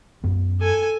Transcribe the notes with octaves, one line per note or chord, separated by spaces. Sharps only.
F#2 B3
A4 G#5